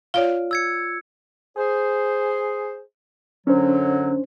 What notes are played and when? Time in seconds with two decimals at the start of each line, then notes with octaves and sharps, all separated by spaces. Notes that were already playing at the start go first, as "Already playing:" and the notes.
0.14 F4 C#5 D5 F5
0.51 E6 G#6 C#7
1.57 G#4 C5
3.47 F#2 D3 F#3 C#4 D4 C5